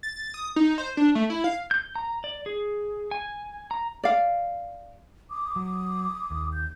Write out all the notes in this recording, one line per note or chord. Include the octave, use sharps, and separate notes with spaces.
A6
D#6
D#4
C5
D4
A3
E4
F5
G6
A#5
D5
G#4
G#5
A#5
D5 F5
D6 D#6
F#3
D#2
G6